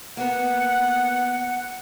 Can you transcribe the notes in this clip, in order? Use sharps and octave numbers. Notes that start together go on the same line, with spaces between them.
A#3 B3 F#5